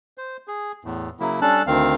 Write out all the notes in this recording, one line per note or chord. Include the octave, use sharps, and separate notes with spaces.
C5
G#4
E2 A2
C#3 F#3 A#3 E4
G3 C#4 D4 A4 A5 F#6
D2 D#3 C4 F5